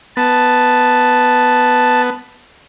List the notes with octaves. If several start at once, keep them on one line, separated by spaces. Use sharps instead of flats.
B3 A5